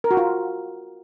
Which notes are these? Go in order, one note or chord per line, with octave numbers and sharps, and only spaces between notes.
A#4
F#4
F4